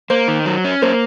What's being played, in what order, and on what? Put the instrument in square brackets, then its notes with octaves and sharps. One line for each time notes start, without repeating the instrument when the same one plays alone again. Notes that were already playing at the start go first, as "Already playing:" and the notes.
[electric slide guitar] A#3 [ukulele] C5
[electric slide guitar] D#3
F#3
C#4
[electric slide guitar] A#3 [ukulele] C5